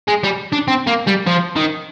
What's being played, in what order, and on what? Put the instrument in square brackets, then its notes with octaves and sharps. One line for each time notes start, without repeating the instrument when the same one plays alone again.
[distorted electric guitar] G#3
G3
D4
C4
A#3
G3
F3
D#3